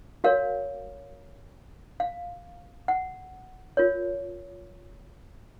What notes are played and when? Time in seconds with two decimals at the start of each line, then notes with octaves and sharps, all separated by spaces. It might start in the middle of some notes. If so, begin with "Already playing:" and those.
0.24 F#4 A#4 C#5 F5
2.00 F5
2.88 F#5
3.77 F4 A#4 C#5